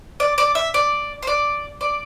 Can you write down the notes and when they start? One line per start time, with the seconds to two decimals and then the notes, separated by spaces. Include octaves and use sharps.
0.20 D5
0.38 D5
0.55 E5
0.74 D5
1.23 C5
1.27 D5
1.81 D5